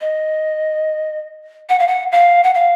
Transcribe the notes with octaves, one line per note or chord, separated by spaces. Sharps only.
D#5
F#5
F5
F#5
F5
F#5
F5